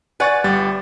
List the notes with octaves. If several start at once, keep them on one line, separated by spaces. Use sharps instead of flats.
B4 D5 F#5 G#5 C#6 A6
G1 G3 A6